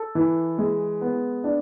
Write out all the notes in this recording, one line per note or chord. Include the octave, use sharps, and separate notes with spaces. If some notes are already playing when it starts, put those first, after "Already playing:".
Already playing: A4
E3
G#3
B3
D4